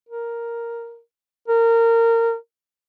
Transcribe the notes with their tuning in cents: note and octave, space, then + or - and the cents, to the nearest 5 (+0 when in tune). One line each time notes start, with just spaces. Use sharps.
A#4 +0
A#4 -20